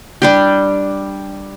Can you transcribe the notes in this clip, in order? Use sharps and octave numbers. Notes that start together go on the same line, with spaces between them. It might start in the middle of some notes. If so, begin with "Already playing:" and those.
G3 D4 G4